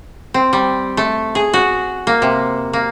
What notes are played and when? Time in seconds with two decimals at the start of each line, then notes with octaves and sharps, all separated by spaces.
0.34 C4
0.53 G3
0.97 A3
1.35 G#4
1.53 F#4
2.07 A#3
2.22 C3
2.73 A#3